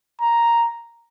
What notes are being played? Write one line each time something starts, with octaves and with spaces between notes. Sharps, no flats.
A#5